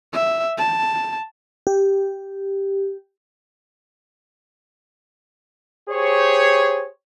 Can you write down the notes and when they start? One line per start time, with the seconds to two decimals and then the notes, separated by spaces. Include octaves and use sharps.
0.13 E5
0.58 A5
1.67 G4
5.89 G4 G#4 C5 C#5